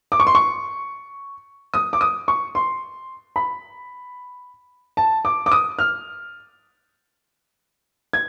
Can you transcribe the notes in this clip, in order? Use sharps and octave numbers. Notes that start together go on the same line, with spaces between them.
D6
C#6
C6
C#6
D#6
D6
D#6
C#6
C6
B5
A5
D6
D6
D#6
F6
G#6